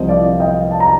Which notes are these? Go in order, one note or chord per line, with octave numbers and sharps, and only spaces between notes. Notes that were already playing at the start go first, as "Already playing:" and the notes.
Already playing: C2 C3 F3 C4 C5 D#5
D5 F5
D#5 G5
A5
A#5